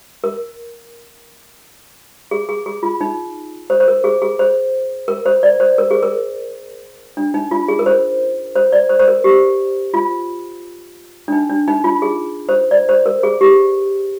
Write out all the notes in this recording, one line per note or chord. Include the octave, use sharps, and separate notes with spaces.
A#4
G#4
G#4
G#4
F4
D#4
C5
C5
A#4
G#4
G#4
C5
A#4
C5
D5
C5
A#4
G#4
A#4
D4
D#4
F4
G#4
A#4
C5
C5
D5
C5
C5
A#4
G4
F4
D4
D#4
D4
D#4
F4
G#4
C5
D5
C5
A#4
G#4
G4